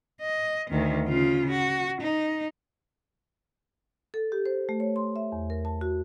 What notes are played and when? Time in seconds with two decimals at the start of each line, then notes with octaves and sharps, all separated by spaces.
0.21 D#5
0.70 D2 D#3
1.08 C#3 F4
1.50 F#4
2.01 D#4
4.14 A4
4.32 G4
4.46 C5
4.69 A3
4.80 C#5
4.96 C6
5.16 E5
5.32 E2
5.50 A#4
5.65 A5
5.81 F#4